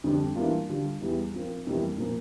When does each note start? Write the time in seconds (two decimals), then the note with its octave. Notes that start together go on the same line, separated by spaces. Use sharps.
0.04 F2 D3 G3 D4 G4
0.36 E3 G3 A#3 D4 F4
0.69 D3 G3 D4 F4
1.01 E2 E3 G3
1.34 F3 C4 F4 A#4
1.67 F2 C3 E3 G3 A#3
1.98 A#2 F3 A#3